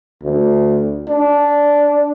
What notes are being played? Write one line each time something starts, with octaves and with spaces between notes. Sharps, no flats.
D2
D4